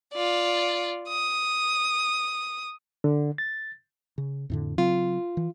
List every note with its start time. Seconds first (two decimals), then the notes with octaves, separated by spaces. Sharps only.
0.13 F4 D5
1.09 D#6
3.04 D3
3.38 A6
4.18 C#3
4.50 F2 A2 D3
4.78 C#3 F#3 C4 F4
5.37 E3